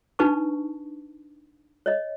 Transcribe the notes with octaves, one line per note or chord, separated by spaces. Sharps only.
D4 D#4 B4 A5 C#6
C#5 D#5